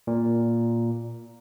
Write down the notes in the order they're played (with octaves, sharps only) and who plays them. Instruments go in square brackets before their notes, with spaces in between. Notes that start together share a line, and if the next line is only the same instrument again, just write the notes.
[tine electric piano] A#2